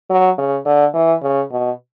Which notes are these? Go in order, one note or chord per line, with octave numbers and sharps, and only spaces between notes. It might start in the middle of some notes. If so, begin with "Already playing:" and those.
F#3
C#3
D3
E3
C#3
B2